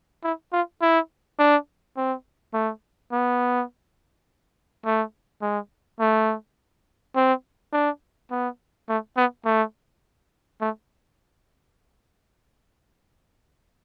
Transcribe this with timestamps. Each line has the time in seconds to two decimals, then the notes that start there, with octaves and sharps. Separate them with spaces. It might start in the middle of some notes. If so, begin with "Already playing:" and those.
0.24 E4
0.53 F4
0.82 E4
1.39 D4
1.97 C4
2.54 A3
3.12 B3
4.85 A3
5.42 G#3
6.00 A3
7.16 C4
7.73 D4
8.31 B3
8.89 A3
9.17 B3
9.46 A3
10.61 A3